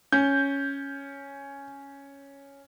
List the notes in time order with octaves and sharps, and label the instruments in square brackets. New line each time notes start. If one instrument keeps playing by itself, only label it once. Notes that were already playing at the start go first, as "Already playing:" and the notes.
[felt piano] C#4 [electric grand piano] G6